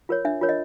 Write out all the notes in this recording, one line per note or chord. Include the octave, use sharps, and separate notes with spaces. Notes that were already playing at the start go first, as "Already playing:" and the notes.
F4 A#4 C#5
D4 E5
F4 A#4 C#5
D#5